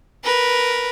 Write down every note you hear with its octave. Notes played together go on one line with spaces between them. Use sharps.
A#4 B4